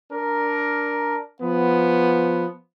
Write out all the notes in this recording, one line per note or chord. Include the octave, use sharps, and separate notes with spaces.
D4 A#4
F3 B3